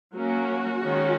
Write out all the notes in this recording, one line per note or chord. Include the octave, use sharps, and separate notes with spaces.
F#3 A#3 C#4 F#4
D#3 G#3 C#4